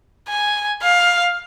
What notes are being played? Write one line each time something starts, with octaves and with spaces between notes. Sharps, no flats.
G#5
F5